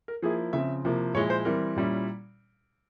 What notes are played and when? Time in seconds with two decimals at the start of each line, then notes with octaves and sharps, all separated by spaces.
0.08 A#4
0.22 F3 A#3 E4 G#4
0.53 C#3 F3 C4 E5
0.85 C3 F3 A#3 E4
1.14 A#2 F3 G#3 E4 C#5
1.30 C5
1.45 E3 G3 C4 E4 A#4
1.76 A#2 G3 C#4 E4